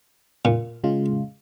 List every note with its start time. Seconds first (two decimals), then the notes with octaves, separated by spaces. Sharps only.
0.45 A#2
0.84 C#3 G#3 F4